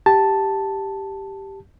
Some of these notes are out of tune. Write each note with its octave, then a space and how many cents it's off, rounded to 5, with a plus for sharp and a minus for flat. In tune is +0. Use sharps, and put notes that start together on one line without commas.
G4 +0 A5 +0